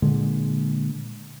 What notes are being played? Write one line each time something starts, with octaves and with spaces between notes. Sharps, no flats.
A#2 D3 G#3